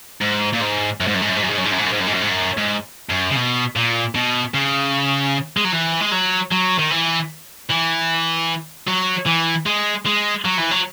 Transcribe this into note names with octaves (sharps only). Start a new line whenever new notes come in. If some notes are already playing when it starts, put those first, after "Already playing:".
G#2
A#2
G#2
F#2
G#2
F#2
G#2
F#2
G#2
F#2
G#2
F#2
G#2
F#2
G#2
F#2
G#2
F#2
G#2
F#2
G#2
F#2
G#2
F#2
C#3
B2
A#2
B2
C#3
G#3
F#3
E3
G#3
F#3
F#3
D#3
E3
E3
F#3
E3
G#3
G#3
F#3
E3
F#3